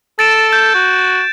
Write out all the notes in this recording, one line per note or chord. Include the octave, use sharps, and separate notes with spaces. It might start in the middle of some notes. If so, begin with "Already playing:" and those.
A4 A6 D7 E7
G6
F#4